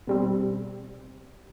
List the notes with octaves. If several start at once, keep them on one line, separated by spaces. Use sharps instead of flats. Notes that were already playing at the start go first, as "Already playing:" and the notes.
B2 G3 C4